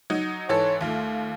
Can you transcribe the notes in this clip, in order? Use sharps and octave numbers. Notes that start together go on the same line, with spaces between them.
F#3 D#4
G#2 E3 A4 C#5
D#2 A3 F4